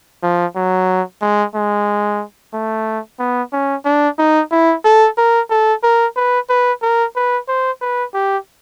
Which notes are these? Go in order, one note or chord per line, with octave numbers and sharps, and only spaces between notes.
F3
F#3
G#3
G#3
A3
B3
C#4
D4
D#4
E4
A4
A#4
A4
A#4
B4
B4
A#4
B4
C5
B4
G4